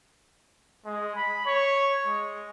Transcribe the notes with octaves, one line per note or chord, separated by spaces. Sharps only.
G#3
B5
C#5
G#3